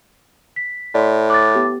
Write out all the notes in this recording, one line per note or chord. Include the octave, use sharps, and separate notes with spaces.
B6
A2 D5 C6
D6 F#6 A6
B3 G4